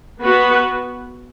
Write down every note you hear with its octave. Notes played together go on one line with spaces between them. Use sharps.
B3 F#4 B4